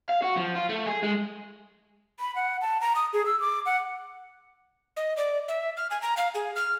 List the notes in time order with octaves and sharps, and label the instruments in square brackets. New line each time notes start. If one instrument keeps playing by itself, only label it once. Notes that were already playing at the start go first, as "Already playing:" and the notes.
[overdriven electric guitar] F5
F#4
F3
F4
A3
G#4
G#3
[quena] B5
F#5
A5
A#5
D#6
G#4
E6
D6
F#5
[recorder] D#5
D5
E5
F6
G#5
A#5
F5
G#4
F6